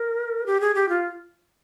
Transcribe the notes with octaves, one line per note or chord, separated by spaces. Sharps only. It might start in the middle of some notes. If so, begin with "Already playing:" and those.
Already playing: A#4
G4
G#4
G4
F4